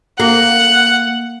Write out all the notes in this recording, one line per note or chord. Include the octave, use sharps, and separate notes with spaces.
A#3 F#5